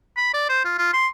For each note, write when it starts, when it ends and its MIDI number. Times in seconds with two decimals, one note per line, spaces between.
0.17 0.33 83
0.34 0.46 74
0.49 0.61 72
0.65 0.73 65
0.78 0.89 65
0.93 1.07 84